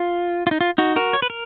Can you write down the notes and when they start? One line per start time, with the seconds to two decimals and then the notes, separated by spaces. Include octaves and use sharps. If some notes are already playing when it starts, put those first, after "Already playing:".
Already playing: F4
0.47 F4
0.51 D#4
0.61 F4
0.78 D#4 F#4
0.96 F#4 A#4
1.13 C#5
1.22 B4
1.30 A#4